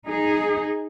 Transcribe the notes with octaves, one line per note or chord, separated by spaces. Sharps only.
D#4 G#4